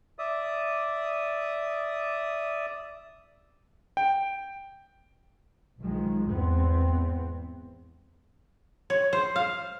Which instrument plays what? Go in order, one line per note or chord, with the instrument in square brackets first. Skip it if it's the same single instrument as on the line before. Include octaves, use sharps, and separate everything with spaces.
[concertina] D5 E5 D#6
[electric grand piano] G5
[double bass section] B1 D#3 F3 G#3
E2 G#2 B3 C4
[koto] C#5
C5
F5